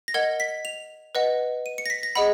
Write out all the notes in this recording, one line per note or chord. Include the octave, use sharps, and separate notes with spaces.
A#6
A#4 D#5 F#5 G#6
B6
F7
B4 D#5 F#5
D#7
C#7
A#6
B6
A#6
G#4 D#5 F#5 B5